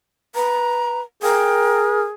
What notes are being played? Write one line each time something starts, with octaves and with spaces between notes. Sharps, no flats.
B4 A#5
G#4 A#4 G5